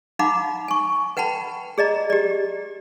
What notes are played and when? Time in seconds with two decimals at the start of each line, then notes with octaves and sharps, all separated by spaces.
0.19 D#4 F5 F#5 A#5 B5 D6
0.68 G#5 C#6
1.17 B4 F#5 G5 A5 B5
1.78 G#4 D5 D#5 A#5
2.10 G4 D5